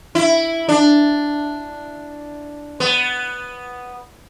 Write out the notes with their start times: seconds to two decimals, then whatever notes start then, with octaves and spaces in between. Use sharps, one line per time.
0.15 E4
0.69 D4
2.80 B3